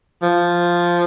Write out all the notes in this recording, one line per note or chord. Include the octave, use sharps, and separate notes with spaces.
F3